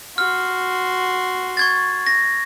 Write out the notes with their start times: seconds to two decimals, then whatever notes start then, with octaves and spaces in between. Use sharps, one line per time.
0.18 F#4 C6 F6
1.57 C#6 G#6 A6
2.07 A#6